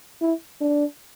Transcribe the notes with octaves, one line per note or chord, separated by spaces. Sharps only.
E4
D4